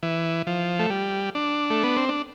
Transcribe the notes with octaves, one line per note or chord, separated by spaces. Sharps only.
E3
F3
A3
G3
D4
A3
B3
C4
D4